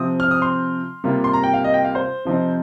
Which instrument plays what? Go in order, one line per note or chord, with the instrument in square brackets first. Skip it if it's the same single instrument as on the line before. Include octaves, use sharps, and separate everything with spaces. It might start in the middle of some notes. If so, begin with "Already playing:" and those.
Already playing: [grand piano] C3 F3 C4 D#6
F6
D#6
C6
C3 G3 A#3 F4
C6
A#5
G5
F5
D#5
G5
F5
C5
C3 F3 C4 D#4